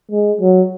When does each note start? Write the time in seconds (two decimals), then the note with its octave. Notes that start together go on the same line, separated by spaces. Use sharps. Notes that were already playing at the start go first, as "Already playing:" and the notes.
0.11 G#3
0.41 F#3